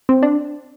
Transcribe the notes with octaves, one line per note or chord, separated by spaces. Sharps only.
C4
D4